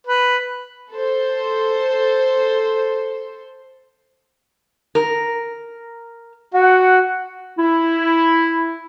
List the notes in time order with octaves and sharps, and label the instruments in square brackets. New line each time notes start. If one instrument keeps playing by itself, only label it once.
[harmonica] B4
[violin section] A4 C5
[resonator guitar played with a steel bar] A#4
[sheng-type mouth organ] F#4 [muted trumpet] F#5
[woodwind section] E4